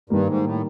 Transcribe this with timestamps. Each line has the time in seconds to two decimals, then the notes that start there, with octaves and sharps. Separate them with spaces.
0.10 G2 D#3 G3 A#3
0.27 G#2
0.44 A2